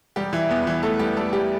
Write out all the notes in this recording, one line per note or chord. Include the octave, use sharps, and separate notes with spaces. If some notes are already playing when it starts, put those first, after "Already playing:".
E1 G3 G4
E3 E4
E2 B3
E3 E4
E3 A3 A4
G3 G4
G3 A3 A4
G3 G4